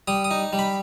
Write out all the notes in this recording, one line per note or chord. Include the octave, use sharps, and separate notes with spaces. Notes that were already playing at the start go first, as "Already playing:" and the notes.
G3 D#6
D#6
D#4
G3
B5